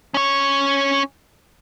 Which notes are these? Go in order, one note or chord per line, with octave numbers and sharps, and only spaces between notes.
C#4 C#5